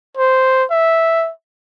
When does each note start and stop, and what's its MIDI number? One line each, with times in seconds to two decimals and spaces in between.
0.17 0.64 72
0.71 1.30 76